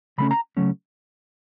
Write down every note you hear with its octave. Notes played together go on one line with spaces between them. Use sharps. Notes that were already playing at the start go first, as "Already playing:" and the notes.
C#3 F#3 A3 C#4 B5
A#5
C#3 F#3 A3 C#4